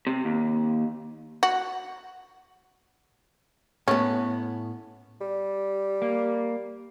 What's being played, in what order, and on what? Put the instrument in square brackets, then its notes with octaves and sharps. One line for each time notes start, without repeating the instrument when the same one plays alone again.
[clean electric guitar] C3
D#2
[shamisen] F#4
[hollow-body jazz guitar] A2 B3 [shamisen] C#4
[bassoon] G3
[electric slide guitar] A#3